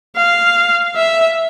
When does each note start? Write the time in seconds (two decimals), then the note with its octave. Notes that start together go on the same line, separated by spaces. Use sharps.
0.16 F5
0.96 E5